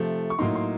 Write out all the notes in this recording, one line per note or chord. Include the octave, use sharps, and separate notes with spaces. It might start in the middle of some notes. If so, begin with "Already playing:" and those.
Already playing: C3 F3 A3
C#6
A2 F#3 A#3 D#4 C6
C6